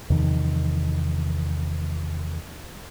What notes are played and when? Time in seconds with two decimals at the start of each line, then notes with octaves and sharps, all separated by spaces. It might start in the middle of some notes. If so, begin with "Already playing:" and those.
0.10 E2 C3 D#3 F3